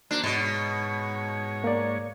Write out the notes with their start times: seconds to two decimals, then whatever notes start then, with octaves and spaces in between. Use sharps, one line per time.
0.11 A#3 D4 F#4 C5
0.23 G#2 B2 C#5 A6
1.64 A#3 D5